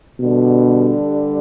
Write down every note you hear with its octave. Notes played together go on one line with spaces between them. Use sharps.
G2 B2 D3 G3 D4 A4